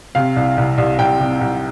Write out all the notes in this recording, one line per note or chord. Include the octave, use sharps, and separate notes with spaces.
C3 F5
C2
C2
C2
C2 G5
C3
C2